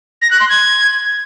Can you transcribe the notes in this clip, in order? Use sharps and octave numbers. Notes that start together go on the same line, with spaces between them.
A#6
F#6
C6
G#6